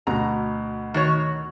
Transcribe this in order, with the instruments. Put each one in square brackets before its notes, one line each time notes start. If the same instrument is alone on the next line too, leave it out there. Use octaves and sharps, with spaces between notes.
[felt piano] D2 B2 B3 [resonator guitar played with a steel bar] A#5
[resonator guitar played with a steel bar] D#3 F#4 C#5